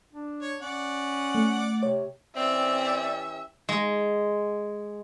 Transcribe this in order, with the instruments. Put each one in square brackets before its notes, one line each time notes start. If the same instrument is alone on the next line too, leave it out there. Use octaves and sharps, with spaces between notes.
[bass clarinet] D4
[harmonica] C#5
[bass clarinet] C#4 [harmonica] D5 F#5
[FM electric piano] A3
[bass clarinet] C3 [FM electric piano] C#5
[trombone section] E3 C#4 G4 [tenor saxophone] C4 [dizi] D5 [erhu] E5
[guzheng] G#3